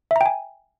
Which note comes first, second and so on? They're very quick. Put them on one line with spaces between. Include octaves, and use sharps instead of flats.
E5 A#5 G5 G#5